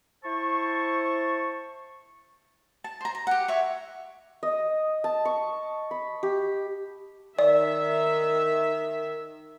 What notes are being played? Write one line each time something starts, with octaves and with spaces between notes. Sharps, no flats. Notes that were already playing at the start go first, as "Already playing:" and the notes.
E4 C5 A5 C#6
A5
C5 A#5
A#5
G4 F#5
C#5 E5
D#5
A5
C#6
B5
G4
D#3 D5 E5